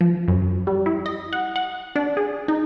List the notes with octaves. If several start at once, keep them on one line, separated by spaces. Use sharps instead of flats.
F3
F#2
G3
E4
D#5
F#5
F#5
D4
G#4
D#4